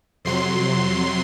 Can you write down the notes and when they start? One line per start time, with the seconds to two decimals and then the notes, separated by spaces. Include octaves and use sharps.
0.25 F2 C3 F#3 C6